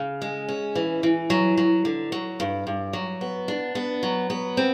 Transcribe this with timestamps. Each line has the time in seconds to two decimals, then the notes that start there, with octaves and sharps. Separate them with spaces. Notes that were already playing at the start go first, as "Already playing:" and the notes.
Already playing: C#3
0.22 G#3
0.49 C#4
0.75 E3
1.03 E3
1.30 F#3
1.57 F#3
1.85 D3
2.12 F#3
2.40 G2
2.67 G2
2.93 F#3
3.21 B3
3.48 D4
3.75 B3
4.03 F#3
4.30 B3
4.57 C4